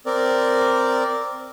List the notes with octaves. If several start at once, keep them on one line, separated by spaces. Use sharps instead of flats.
C4 A#4 D5